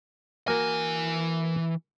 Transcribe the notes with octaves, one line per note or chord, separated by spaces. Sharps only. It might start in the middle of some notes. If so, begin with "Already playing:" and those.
E3 A#3 F#4 A#4 G#5